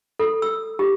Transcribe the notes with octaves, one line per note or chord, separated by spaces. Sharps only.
A4
E6
G4